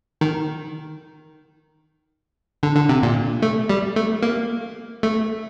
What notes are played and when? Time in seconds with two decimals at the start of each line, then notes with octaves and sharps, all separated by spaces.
0.21 D#3
2.63 D3
2.76 D3
2.89 C3
3.03 A#2
3.42 A3
3.69 G3
3.96 A3
4.22 A#3
5.03 A3